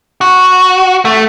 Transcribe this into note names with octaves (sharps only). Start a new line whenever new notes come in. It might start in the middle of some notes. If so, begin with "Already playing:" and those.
F#4
A3